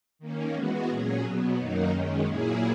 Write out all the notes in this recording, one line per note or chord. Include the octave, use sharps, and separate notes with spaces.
D#3 A#3 C#4
E3 G#3 B3 F#4
A#2 F#3 C#4 G#4
B2 F#3 B3
F#2 D#3 F#3 A#3 D#4
F#2 D#3 G#3 C#4
A#2 F#3 A#3 E4 G#4